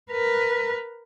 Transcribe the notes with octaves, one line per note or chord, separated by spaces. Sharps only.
A#4 B4